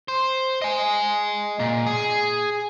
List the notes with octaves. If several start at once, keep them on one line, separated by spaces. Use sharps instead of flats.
C5
D#5 G#5
A#2
G#4